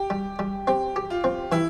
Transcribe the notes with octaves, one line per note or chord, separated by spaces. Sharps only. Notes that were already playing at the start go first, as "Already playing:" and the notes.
Already playing: G4
G3
G3
C4 G4
G4
F4
C4
E3 E4